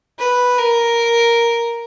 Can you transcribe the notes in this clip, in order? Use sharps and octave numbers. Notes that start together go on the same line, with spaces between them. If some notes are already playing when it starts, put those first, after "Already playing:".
B4
A#4